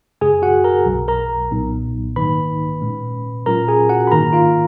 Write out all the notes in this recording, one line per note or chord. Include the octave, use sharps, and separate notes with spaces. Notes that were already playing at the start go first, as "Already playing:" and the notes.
F#2 C#3 G#3 G#4 G#5
F#4 F#5
A#4 A#5
B1 B2 F#3
A#4 A#5
B1 A#2 F#3 B3 D#4
G#2 D#3 A#3 D#4 B4 B5
A#2 G#3 C#4
A#2 F#3 C#4 F4 A#4 A#5
G#4 G#5
F#4 F#5
B5
G#2 D#3 A#3 D#4 A#4 A#5
F4 F5